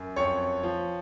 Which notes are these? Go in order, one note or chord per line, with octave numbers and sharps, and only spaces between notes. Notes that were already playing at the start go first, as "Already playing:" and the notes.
Already playing: F#2
F2 C#5 C#6
F3